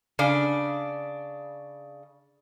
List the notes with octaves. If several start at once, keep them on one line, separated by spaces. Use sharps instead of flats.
C#3 D4